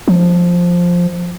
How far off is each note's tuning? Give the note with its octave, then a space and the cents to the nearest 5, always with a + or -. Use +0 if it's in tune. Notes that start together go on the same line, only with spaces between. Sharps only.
F3 +5